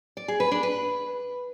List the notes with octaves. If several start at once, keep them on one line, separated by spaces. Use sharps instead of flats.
D5
G#4
B4
D4
B4